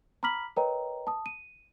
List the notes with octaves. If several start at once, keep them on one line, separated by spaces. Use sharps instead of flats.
A#5 B5 D6 F6 B6 F#7
A#4 B4 C#5 D#5 G5 A#5
A5 D#6
D#7